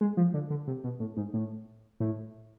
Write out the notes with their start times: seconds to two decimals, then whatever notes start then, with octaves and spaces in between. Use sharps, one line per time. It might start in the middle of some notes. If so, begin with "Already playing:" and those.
0.01 G#3
0.17 F3
0.34 D3
0.50 D3
0.67 C3
0.84 B2
1.00 A2
1.17 G#2
1.34 A2
2.00 A2